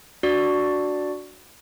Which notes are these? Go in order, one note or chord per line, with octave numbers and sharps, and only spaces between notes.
D4 F#4 D5